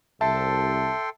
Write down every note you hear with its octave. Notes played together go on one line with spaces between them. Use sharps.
C2 A4 E5 G5 A5 C6